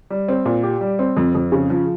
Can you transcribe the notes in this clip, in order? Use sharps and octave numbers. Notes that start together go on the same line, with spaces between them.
G3
C4
A#2
G4
G3
C4
F2
F2
C#3
F3